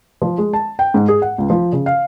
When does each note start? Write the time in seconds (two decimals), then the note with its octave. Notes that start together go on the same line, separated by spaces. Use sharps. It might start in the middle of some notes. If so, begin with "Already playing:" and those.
0.22 F3
0.38 G#3
0.53 A5
0.79 G5
0.94 G#2
1.08 G#4
1.22 F#5
1.38 C#2
1.50 F3
1.73 C#3
1.86 F5